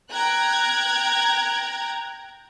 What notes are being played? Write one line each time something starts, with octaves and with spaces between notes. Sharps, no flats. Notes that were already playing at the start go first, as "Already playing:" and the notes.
G5 A#5 F#6 G#6